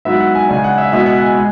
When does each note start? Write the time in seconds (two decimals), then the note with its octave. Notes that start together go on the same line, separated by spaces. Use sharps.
0.05 G#2 F#3 B3 E4 E5
0.20 F#5
0.35 G#5
0.49 C#3 G#3 D4 G#5
0.64 F#5
0.78 E5
0.92 B2 G#3 B3 E4 E5
1.06 F#5
1.21 G#5
1.35 G#3